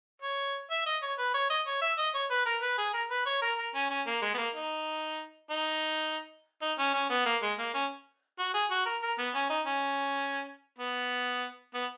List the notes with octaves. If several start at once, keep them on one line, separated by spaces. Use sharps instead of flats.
C#5
E5
D#5
C#5
B4
C#5
D#5
C#5
E5
D#5
C#5
B4
A#4
B4
G#4
A#4
B4
C#5
A#4
A#4
C#4
C#4
A#3
G#3
B3
A#3
D#4
D#4
D#4
C#4
C#4
B3
A#3
G#3
A#3
C#4
F#4
G#4
F#4
A#4
A#4
B3
C#4
D#4
C#4
B3
B3